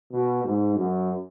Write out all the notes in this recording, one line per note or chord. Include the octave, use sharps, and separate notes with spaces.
B2
G#2
F#2